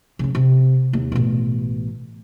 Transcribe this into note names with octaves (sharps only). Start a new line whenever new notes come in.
C#3 F#3
C3
D#2
A1 B2